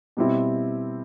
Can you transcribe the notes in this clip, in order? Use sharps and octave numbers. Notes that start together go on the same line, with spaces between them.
B2 G3 C4 E4